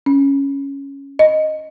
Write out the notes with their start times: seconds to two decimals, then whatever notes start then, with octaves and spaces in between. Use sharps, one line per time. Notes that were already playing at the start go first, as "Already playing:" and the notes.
0.06 C#4
1.19 D#5